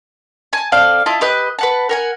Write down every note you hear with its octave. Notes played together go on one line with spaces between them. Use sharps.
G#5 A5
C4 A4 D5 F5
E4 F4 D#5 A5
G4 B4 D#5 F#6
B4 F#5 A5
A#4 F#5 G#5